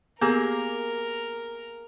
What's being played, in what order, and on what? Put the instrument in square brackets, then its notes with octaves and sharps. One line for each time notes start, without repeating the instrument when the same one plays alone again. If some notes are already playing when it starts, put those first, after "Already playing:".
[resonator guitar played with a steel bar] A#3 G#4 [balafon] B3 G4 [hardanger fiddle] A#4